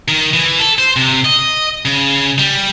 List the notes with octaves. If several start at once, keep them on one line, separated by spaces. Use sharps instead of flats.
D#3
E3
A4
C5
C3
D#5
C#3
G3